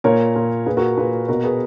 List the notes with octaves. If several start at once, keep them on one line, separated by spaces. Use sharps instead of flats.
A#2 A#4 C#5
A#2
A#2 G#4 B4
F#4 A#4
A#2 G#4 B4
B2 F#4 A#4
G#4 B4